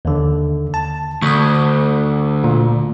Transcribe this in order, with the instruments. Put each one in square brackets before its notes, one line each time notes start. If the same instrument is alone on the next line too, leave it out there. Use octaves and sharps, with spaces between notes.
[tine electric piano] D#2 D3
A5
[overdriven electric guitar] D2 [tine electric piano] C#6 D#6
[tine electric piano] A#2